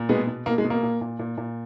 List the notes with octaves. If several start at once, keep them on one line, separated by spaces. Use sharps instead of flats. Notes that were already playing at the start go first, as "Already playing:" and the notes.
Already playing: A#2
B2 G#3 B3
B2
B2 A#3
G#3
B2
A#3
A#2
A#2
A#2
A#2